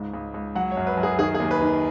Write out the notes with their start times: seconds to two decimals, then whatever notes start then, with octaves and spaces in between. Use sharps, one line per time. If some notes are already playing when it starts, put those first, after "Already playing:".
Already playing: C#2 G#2
0.14 C#2
0.34 C#2
0.55 F#3 F#5
0.72 C#5
0.77 F#2
0.87 B4
0.97 F#2
1.03 G#4
1.19 D#3 G#4
1.34 G#4
1.40 D#2
1.51 B4
1.62 D#3